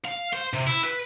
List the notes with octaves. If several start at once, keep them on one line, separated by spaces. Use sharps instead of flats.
F5
C5
C3
E4
B4